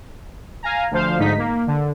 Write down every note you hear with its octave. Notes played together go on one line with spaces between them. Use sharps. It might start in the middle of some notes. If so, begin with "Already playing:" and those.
F5 G#5 A#5
D2 F3 C5 F5
D2 G#2 D#4 B6
A#3
D3